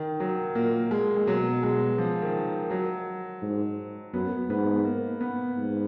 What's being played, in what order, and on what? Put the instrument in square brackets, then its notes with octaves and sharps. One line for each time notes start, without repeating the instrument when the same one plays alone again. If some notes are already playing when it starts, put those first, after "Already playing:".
Already playing: [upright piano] D#3
F#3
[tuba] A#2 [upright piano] A#3
[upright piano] G#3
G#3
[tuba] B2 [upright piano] F#3
[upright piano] G#3
F3
D#3
F#3
[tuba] G#2
[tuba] F#2 [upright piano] B3
[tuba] G#2 [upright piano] B3
[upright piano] A#3
B3
[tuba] G#2